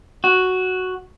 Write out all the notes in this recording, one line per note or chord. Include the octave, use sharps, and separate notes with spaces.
F#4